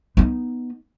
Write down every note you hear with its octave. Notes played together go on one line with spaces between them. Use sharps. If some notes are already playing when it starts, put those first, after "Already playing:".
B3 D#4